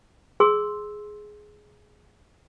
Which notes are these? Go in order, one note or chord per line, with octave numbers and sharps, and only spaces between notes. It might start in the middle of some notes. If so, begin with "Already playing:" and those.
G#4 C6 E6